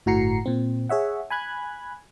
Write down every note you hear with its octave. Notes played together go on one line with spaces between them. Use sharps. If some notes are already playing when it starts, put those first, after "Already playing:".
G1 A2 F#4 A#5 C7 C#7
A#2 C4
G#4 C#5 E5 F#5
G#5 B5 F#6 G#6